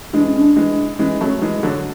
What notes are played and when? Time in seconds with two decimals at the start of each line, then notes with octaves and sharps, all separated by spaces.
0.13 E3 G#3 D4
0.26 C#4
0.38 D4
0.56 E3 G#3
0.99 E3 G#3 C#4
1.21 F#3 A3
1.42 E3 G#3
1.63 D3 F#3